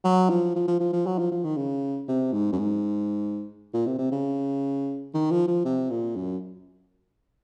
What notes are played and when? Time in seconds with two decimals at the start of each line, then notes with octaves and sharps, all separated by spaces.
0.04 F#3
0.29 F3
0.55 F3
0.68 F3
0.80 F3
0.93 F3
1.06 F#3
1.18 F3
1.31 F3
1.44 D#3
1.57 C#3
2.08 C3
2.33 G#2
2.52 F#2
2.59 G#2
3.73 A#2
3.87 C3
3.98 C3
4.11 C#3
5.14 D#3
5.31 F3
5.48 F3
5.65 C3
5.90 A#2
6.16 F#2